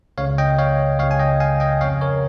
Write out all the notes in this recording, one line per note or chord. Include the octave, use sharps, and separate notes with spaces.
C#2 C#3 C#5 F5
D#5 G5
C#5 F5
C#2 C#3 C#5 F5
G#5
D#5 G5
F5 G#5
D#5 G5
F2 C#3 C#5 F5
A#4 C#5